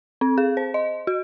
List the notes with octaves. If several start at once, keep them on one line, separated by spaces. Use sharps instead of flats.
C4
G#4
C5
D#5
F#4